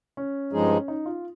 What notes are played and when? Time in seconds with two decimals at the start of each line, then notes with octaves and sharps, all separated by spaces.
0.17 C#4
0.52 G2 F3 G#3 D#4 G#4
0.88 D#4
1.05 F4